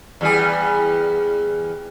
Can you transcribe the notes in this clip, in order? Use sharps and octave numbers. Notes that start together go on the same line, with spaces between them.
E2 G3 G#4